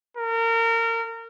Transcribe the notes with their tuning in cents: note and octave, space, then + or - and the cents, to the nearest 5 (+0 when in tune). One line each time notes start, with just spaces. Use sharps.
A#4 -30